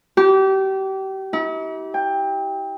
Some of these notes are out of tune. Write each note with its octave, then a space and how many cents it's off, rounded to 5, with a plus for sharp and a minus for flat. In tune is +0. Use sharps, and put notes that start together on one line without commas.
G4 -30
E4 -45
G5 +20